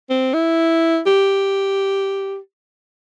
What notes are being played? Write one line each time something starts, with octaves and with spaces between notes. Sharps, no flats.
C4
E4
G4